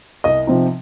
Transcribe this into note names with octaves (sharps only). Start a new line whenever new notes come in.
C2 D#5
C3 F3 C4 D#4